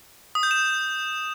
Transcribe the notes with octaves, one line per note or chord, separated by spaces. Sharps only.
D#6
G6
E7